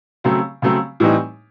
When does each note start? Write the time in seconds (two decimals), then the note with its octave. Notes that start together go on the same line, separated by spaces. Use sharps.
0.24 C#3 F#3 A3 C4
0.62 C#3 F#3 A3 C4
1.00 A2 E3 G3 C4 D#4